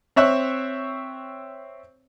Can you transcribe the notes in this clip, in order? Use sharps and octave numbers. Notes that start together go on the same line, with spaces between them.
C4 C#5 E5 F#6